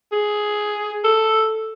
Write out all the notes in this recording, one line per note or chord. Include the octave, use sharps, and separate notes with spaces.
G#4
A4